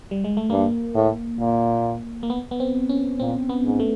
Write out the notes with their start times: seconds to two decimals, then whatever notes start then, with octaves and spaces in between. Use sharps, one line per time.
0.11 G3
0.24 G#3
0.37 A3
0.50 G2 A#3
0.95 A2
1.40 A#2
2.23 A#3
2.30 B3
2.51 B3
2.60 C4
2.89 C#4
3.20 A#2 C4
3.49 B3
3.64 G#2
3.80 A3